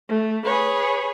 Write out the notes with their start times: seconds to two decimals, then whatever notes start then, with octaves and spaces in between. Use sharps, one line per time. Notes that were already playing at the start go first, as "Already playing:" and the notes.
0.10 A3
0.44 G#4 B4 C#5